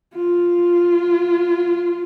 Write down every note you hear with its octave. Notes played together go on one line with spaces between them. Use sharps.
F4